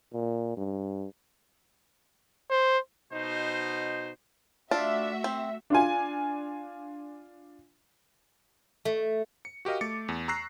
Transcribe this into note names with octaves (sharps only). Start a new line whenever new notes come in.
A#2
G2
C5
B2 D#4 F#4 C5
A3 D4 F4 F#4 E5
C4
D4 F4 G#5
A3
C#7
F#4 G4 A#4 D#5 F5
A3 D6 A6 C#7
E2
A#5 C#6 E6 F#6 A#6 C7